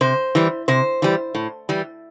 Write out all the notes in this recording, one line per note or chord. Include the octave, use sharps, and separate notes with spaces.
C3 C5
E3 G3
C3 C5
E3 G3
A2
E3 G3